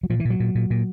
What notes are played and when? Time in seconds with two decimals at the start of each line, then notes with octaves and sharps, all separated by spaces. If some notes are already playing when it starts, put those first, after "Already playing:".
0.03 F#3
0.10 A#2 F3
0.20 E3
0.25 A#2
0.30 F#3
0.40 A#2
0.55 A#2
0.70 A#2